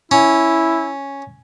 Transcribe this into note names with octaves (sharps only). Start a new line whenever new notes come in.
C#4 E4